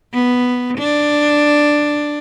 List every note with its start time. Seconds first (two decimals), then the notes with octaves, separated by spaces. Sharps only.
0.14 B3
0.78 D4